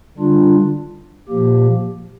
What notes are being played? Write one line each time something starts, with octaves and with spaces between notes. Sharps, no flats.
D3 G3 D4 F4
A#2 F3 A#3 G4